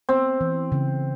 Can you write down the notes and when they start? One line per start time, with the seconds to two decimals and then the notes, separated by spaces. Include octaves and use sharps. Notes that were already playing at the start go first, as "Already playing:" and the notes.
0.09 B3 C4
0.41 E3
0.72 C#3